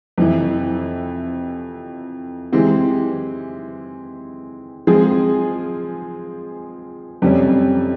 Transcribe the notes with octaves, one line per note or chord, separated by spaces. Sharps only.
F2 C3 E3
E3 G#3 C4 G4
F3 G#3 C4 F4 G#4
F2 C3 G3 C#4